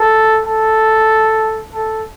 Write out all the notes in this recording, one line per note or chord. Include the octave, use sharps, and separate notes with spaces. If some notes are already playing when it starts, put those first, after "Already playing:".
Already playing: A4
A4
A4